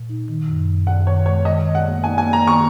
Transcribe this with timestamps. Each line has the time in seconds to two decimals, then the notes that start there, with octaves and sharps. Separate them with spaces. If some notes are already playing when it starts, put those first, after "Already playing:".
Already playing: A#2
0.09 D#4
0.28 D#3
0.48 F#2
0.67 F#2
0.87 F#2 F#5
1.06 D#3 C#5
1.26 G#3 C#5
1.45 D#3 D#5
1.65 D#3
1.75 F#5
1.84 A#3
2.04 D#4 G#5
2.18 A#3 G#5
2.33 A#5
2.42 D#3 C#6